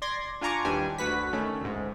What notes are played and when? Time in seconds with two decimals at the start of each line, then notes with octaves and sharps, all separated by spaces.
0.02 D5 C6 G#6 A#6
0.41 D4 F4 G#5 A#5 C#6 D6
0.65 D#2 E3 G3 D4 G4 G#5
0.98 D2 F#4 B4 B6
1.32 D#3 A3 C#4
1.60 D2 G#2